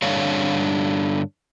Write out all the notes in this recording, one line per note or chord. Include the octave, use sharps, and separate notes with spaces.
G2 D3 D4 C#5 F5